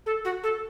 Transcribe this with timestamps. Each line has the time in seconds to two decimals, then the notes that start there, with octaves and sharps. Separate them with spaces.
0.06 A4
0.24 F#4
0.43 A4